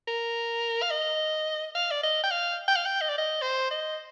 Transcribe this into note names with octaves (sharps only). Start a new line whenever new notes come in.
A#4
F5
D#5
F5
D5
D#5
G5
F5
G5
F5
G5
D#5
D5
D#5
C5
D#5